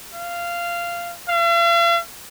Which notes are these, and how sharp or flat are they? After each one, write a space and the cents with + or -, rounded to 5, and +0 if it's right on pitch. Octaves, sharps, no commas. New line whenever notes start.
F5 -15
F5 -45